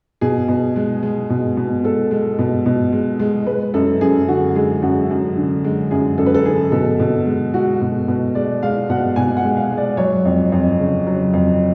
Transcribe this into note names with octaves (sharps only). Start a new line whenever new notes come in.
B2 G#4
B2
G#3
G#3
B2
B2
G#3 A4
G#3
B2
B2
G#3
G#3
G#3 B4
F#2 A4
F#2 G#4
D3 F#4
G#3 G#4
F#2 F#4
F#2
D3
G#3
F#2 G#4
F#2 A4
B4
A4
D3 G#4
B2 A4
B2
G#3
G#3 F#4
B2
B2
G#3 D5
G#3 F5
B2 F#5
B2 G#5
F#5
G#3
F5
G#3
D5
F#3 C#5
F2
F2
C#3
F#3
F2